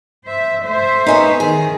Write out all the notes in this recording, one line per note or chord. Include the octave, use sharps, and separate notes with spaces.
C5 E5
A3 C5 E5
B3 C#4 D#4
D#3 G#4